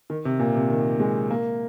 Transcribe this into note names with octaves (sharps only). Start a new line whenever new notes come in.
D#3
C3
A#2
C3
D#3
G#3
A#3